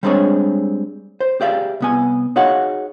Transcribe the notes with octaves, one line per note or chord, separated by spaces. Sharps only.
G3 G#3 C4 D4 G#4 C#5
C5
G4 G#4 D5 E5 F5
C2 B3 G#5
D#4 F#4 G#4 C#5 F5 F#5